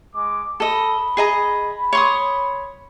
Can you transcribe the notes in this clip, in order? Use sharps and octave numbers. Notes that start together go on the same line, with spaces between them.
G#3 D6
A4 D#5 B5
G#4 D#5 A#5
C#5 C6 D#6